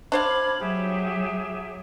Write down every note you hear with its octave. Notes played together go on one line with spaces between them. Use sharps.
D4 C5 F5 B5 D6 G#6
F#3 G4 G#4 E5